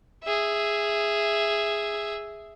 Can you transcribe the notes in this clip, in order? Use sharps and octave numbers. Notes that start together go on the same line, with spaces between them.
G#4 E5